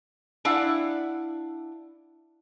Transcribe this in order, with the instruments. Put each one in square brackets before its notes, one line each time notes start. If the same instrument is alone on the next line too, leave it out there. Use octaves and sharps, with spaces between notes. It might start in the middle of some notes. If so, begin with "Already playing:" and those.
[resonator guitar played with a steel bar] D4 E4 F5 F#5